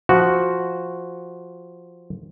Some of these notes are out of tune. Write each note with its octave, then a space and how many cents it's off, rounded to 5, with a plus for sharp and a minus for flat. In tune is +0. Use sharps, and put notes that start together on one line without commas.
F3 +0 F#4 +0